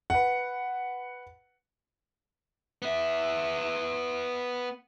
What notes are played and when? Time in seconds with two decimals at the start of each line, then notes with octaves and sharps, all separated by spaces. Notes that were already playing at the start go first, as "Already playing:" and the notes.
0.10 B4 F#5
2.82 B3 E5